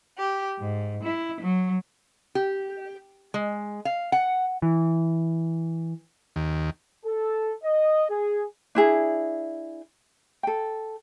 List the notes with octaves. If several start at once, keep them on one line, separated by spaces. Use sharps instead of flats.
G4
G#2
E4
F#3
G4
G#3
F5
F#5
E3
D#2
A4
D#5
G#4
D4 E4 G#4
A4 G5